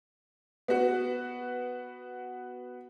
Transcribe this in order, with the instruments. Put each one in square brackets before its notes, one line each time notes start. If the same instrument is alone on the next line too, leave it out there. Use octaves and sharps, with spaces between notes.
[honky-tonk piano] B3 F#4